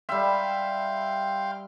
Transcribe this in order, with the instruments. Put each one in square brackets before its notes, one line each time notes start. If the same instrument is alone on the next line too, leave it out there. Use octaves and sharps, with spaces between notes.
[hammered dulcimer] G3 E5 [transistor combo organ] F5 G5 C6